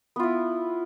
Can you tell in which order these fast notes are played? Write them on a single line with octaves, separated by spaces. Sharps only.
B3 F4 E4